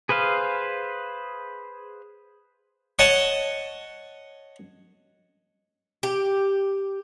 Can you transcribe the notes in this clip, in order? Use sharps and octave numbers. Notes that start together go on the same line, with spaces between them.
G#4 B4 C5 F5
C#5 D#5 F#5 A5
G4